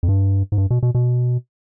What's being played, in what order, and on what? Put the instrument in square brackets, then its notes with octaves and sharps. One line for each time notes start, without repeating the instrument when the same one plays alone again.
[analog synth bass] F2
G2
G#2
G2
B2
B2
B2